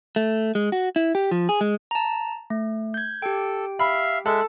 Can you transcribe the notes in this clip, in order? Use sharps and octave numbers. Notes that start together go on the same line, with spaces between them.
A3
G#3
F#4
E4
G4
F3
G#4
G#3
A5 A#5
A3
G6 G#6
G4 A4 G5
E5 F5 B5
G#3 A4 E5 F#6